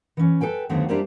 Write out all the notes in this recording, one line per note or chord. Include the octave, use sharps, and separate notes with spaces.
E3 C#4
A4 B4 G5 G#5
D#2 D3 F#3 A3 B3 C4
G3 A#3 C4 D4 E4 G4